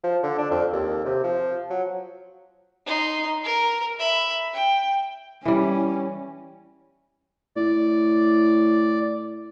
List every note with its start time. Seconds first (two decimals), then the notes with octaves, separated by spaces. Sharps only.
0.04 F3
0.23 D3
0.38 D4
0.51 F2
0.72 D#2
1.05 C3
1.23 F3
1.70 F#3
2.86 D#4 C6
3.44 A#4
3.99 E5 B5
4.53 G5
5.45 E3 G3 C#4
7.56 A2 D5